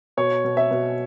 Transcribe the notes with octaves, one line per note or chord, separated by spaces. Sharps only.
B2 C#5
B2
E5
B2